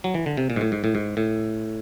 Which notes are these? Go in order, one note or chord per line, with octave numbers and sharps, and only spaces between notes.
F#3
E3
D3
C3
A#2
G#2
A2
G#2
A2
G#2
A2